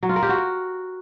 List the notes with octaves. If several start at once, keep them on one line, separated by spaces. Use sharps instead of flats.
F#3
F4
A#4
G4
F#4